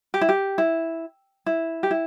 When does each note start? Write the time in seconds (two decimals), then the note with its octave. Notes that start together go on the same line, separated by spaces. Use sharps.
0.14 G4
0.21 E4
0.29 G4
0.58 E4
1.46 E4
1.83 G4
1.91 E4